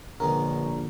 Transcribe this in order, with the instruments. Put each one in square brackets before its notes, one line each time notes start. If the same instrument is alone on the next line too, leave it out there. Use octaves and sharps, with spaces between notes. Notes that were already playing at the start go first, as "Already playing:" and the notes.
[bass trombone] A#1 [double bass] D3 [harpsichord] G#3 B3 C#4 [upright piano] A#4